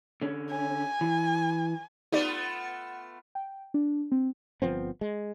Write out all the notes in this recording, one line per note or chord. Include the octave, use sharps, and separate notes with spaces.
D3 C#4
G#5
E3
A3 B3 D#4 F4 G4 D5
G5
D4
C4
G1 F3 B3 C4
G#3